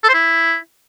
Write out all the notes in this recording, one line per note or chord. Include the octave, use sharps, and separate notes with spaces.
A4
C5
E4